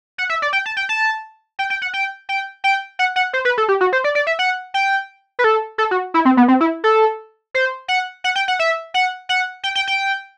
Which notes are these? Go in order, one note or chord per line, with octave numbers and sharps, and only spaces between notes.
F#5
E5
D5
G5
A5
G5
A5
G5
G5
F#5
G5
G5
G5
F#5
F#5
C5
B4
A4
G4
F#4
C5
D5
D5
E5
F#5
G5
B4
A4
A4
F#4
E4
C4
B3
C4
E4
A4
C5
F#5
F#5
G5
F#5
E5
F#5
F#5
G5
G5
G5